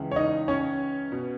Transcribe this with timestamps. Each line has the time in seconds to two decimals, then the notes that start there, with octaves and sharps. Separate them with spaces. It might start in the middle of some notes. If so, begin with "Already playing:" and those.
Already playing: C#2 C#3 E3
0.12 C#5
0.16 D#4 D#5
0.48 C#4 C#5
1.12 B2